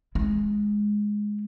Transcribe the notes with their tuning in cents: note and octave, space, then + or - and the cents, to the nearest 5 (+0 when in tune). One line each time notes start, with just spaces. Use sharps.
G#3 +0 E4 +0